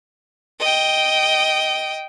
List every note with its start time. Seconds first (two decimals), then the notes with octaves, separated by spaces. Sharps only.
0.60 D#5 G5